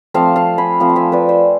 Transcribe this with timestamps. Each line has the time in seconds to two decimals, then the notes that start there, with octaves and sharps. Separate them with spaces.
0.14 F3 A3 C4 F4 F5 A5
0.36 F5 A5
0.58 G#5 B5
0.80 F3 A3 C4 F4
0.89 F5
0.96 E5 G#5
1.12 B4 D5
1.29 C5 E5